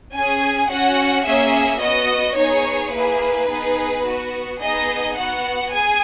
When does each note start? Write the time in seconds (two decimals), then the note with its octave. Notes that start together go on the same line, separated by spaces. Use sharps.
0.15 C#4 G#4 G#5
0.70 C#4 F#4 F#5
1.26 A#3 C#4 G#4 E5
1.81 B3 F#4 D#5
2.37 B3 D#4 G#4 C#5
2.93 A#3 E4 G#4 B4
3.49 B3 D#4 G#4
4.05 B3 F#4
4.61 B3 D#4 G#4 D#5
5.17 B3 F#4 F#5
5.72 G#4 G#5